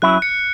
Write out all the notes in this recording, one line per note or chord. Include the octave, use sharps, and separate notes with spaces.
F#3 C#4 E4 F#6
C#7